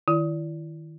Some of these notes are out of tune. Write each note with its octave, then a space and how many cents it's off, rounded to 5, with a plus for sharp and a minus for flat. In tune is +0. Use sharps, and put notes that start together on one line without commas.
D#3 +0 E4 +30